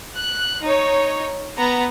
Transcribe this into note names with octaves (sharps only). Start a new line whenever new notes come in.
F#6
D#4 C#5
B3 A#5